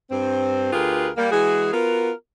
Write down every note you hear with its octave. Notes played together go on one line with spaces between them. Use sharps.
G2 C4
D2 F4 G4 G#4 A#4 B4
G3 A#3
E3 G#3 F#4 G#4
B3 F4 F#4 A#4